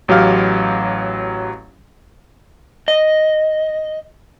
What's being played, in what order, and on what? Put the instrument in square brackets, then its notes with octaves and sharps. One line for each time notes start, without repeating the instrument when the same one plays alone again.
[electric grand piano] A1 F#3 G4 F5 F6
[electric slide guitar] D#5